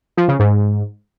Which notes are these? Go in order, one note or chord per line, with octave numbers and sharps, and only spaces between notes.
F3
C#3
G#2